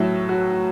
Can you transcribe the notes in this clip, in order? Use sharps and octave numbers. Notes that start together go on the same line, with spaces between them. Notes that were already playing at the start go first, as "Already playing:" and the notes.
Already playing: A2 F#3 E4
F#4